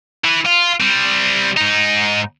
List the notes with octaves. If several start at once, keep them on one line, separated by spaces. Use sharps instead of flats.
E3
F4
G3 C4
G#2 D#4